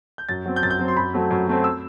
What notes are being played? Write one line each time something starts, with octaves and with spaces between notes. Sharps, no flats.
G6
F#2 A6
F#3 C4
G6
F#2 A6
G6
F#3 C4
C6
F#2 B5
F#3 A3 C4
F#2
F#3 A3 C4
E6